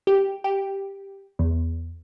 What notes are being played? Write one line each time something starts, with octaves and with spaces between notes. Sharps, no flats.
G4
G4
E2